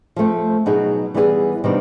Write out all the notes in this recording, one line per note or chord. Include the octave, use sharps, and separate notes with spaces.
F3 A3 C4
B2 F#3 B3 D#4 G#4
E3 G3 B3 E4 G#4
C3 D#3 G3 B3 D4